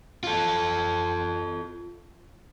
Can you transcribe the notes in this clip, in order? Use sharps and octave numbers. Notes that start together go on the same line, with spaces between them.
F4 A4